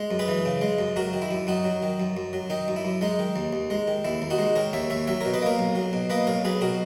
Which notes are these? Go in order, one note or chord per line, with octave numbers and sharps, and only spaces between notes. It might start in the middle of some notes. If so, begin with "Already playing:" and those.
Already playing: G#3
F#2
G#4 B4
E3
C#3
G#3
F#2
F#3 F#4 A#4
D#3
E4
F#2
F#2 D#4 F#4
F#3
D#3
F#2
F#2
F#3
D#3 D#4
F#2
E4
F#2
G#3 D#4
D#3
D#2
D#2
G#3
D#3
D#2 E4
D#2
D#4 F#4
G#3
D#3 A#4 C#5
D#2 C#5 E5
D#2 C#5 E5
F#3 C#5 E5
B2 A#4 C#5
B4 D#5
A#3 A#4 C#5
B1
F#3
B2
A#3 B4 D#5
B1 A#4 C#5
F#3 G#4 B4
B2 F#4 A#4